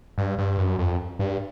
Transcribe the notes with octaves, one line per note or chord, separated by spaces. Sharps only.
G2
G2
F#2
F2
G2